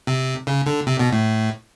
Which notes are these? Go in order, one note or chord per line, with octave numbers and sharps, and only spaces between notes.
C3
C#3
D3
C3
B2
A2